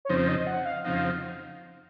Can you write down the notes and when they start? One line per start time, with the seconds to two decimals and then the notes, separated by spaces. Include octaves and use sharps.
0.05 C#5
0.09 F2 C#3 F3 C4 D#4 C5
0.28 D#5
0.47 F#5
0.65 F5
0.85 F2 C#3 F3 C4 D#4 F5